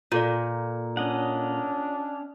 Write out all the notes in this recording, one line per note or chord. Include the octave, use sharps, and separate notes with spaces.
A#2 F4 A4 D5
C#4 D4 D#5 F#5